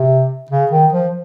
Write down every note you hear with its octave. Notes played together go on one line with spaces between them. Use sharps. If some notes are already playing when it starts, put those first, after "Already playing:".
Already playing: C3
C#3
D#3
F3